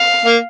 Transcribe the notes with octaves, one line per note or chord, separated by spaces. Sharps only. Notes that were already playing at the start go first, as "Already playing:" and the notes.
Already playing: F5
A#3